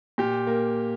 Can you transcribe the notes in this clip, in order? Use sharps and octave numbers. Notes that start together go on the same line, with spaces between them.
A#2 G4
A#3